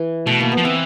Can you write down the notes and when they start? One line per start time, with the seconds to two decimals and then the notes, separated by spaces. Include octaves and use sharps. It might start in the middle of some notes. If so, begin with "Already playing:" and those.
Already playing: E3
0.27 B2 A3
0.40 A#3
0.52 B3
0.58 F3
0.65 E3 C4